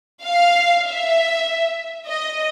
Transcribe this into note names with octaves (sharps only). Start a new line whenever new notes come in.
F5
E5
D#5